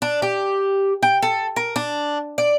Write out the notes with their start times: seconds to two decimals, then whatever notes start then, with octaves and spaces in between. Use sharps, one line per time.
0.02 D4
0.22 G4
1.03 G5
1.22 A4
1.56 A#4
1.76 D4
2.38 D5